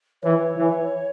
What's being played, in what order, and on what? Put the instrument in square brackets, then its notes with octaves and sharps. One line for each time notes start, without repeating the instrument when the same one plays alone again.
[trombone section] E3 [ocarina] C#5
[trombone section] E3